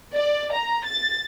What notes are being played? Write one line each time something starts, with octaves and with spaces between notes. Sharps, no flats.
D5
A#5
A6